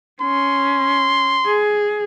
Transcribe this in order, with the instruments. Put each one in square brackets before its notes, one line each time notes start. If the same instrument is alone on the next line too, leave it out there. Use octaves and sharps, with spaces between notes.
[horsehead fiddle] C#4 [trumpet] C6
[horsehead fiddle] G#4